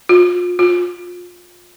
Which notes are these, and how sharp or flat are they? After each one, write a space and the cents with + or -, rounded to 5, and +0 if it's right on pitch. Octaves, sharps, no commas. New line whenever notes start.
F4 +35
F4 +25